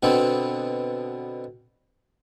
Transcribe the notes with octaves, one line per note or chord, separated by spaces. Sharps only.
B2 D3 B3 C4